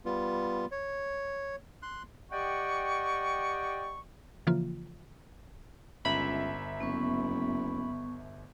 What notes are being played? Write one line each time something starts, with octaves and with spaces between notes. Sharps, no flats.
G3 B3 F4
C#5
C6 F#6
G4 D5 D#5 F#5 G5 C#6
C#3 E3 F3 A#3 F4
G1 C#2 E5 A#5 B5
F#1 B3 C#6